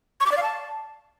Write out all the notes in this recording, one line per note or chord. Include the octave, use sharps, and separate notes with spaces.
C#6
D6
D5
F5
A5